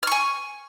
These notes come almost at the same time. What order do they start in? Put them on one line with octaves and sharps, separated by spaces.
F6 C#6 G#5